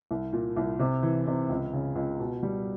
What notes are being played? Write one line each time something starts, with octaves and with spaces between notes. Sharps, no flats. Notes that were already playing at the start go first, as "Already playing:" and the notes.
C2
A#2
C2
C3
E3
C3
C#2
C#3
C#2
B2
G3